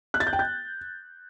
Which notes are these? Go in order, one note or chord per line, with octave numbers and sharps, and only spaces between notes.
F#6
A6
G6
G5
G6